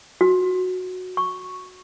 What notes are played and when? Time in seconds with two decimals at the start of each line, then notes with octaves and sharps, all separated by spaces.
0.21 F#4
1.17 C#6